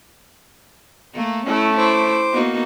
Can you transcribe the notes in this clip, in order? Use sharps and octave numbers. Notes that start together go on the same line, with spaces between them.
A3 A#3
A3 C#4 E4
E4 C5 D6
A#3 B3 D#4 F#4